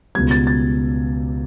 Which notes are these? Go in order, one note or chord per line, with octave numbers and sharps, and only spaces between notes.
C#2 B2 G3 G#6
A6
A6